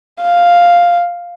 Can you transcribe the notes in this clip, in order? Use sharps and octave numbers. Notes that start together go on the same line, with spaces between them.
F5